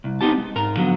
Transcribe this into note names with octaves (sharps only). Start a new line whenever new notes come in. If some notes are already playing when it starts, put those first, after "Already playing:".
C2
B3 C4 D#4 G4 A5
G#3
G#2 A#4 A#5
D3 F3 F#3 B3